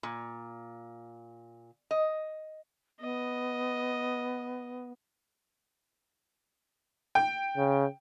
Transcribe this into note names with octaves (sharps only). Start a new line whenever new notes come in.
A#2
D#5
B3 D#5
G5
C#3